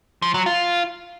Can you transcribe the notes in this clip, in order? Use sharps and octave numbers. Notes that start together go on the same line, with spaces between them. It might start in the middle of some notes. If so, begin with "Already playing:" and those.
F3
F#3
F4